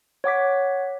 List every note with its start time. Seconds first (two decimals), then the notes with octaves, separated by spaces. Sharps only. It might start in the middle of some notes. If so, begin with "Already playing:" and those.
0.24 C#5 F#5 D6 B6